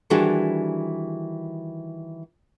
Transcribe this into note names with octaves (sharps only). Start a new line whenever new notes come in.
D#3 E3 G3 D4 F#4 G#4